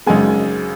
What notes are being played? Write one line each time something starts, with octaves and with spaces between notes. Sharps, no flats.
G#1 F#2 C#3 G#3 G#5